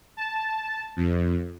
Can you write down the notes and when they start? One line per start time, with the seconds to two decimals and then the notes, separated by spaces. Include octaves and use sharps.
0.17 A5
0.96 F2